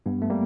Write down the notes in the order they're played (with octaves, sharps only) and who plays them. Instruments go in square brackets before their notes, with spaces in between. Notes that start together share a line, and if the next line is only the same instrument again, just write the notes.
[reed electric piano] G2 [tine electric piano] B3
[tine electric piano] A3
[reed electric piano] G3 A#3